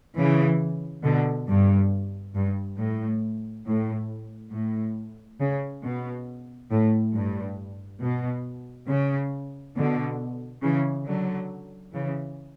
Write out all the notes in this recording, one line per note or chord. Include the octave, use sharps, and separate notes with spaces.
C#3 E3
B2 D3
G2
G2
A2
A2
A2
C#3
B2
A2
G2
B2
C#3
B2 D3
C#3 E3
D3 F#3
C#3 E3